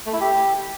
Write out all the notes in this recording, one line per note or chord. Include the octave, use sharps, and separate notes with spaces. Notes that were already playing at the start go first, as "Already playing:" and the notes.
A3
E4
G4